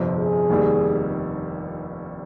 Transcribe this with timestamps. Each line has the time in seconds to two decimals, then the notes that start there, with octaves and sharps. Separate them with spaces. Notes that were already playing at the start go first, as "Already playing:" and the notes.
Already playing: G1 F2 C3 F3 C4
0.19 G#4
0.49 F1 D#2 D#3 G3